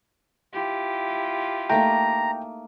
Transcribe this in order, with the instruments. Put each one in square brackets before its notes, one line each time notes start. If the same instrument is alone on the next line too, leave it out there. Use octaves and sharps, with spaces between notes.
[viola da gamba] E4 F4 G4
[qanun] A3 A#3 D#4 [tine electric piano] G5 [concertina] A#5